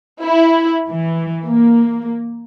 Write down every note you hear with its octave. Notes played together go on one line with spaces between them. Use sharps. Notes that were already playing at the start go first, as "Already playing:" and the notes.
E4
E3
A#3